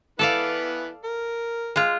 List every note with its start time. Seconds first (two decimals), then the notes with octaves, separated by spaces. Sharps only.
0.19 E3 B3 A4 B4 D5 F5
1.04 A#4
1.76 G#3 F4